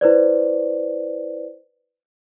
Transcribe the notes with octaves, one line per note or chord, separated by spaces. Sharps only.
E4 B4 C5 D5